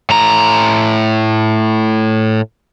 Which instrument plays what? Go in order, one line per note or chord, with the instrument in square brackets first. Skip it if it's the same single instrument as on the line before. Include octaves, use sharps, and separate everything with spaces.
[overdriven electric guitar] A2 A#5